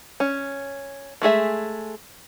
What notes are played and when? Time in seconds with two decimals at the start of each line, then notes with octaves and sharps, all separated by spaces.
0.20 C#4
1.22 G#3 A3 G#4 E5